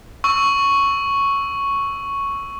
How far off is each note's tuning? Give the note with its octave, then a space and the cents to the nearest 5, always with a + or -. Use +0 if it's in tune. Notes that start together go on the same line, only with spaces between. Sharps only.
C#6 +0 E6 +0